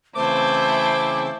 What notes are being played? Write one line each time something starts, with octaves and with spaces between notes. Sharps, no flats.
C#3 E3 A3 C4 E4 C5 D6